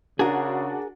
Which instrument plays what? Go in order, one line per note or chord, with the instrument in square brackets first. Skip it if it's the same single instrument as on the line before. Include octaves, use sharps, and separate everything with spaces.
[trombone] C#3 [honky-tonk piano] D4 F#4 [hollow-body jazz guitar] G#4 A#4